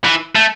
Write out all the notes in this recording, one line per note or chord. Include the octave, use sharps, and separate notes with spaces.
E3
A3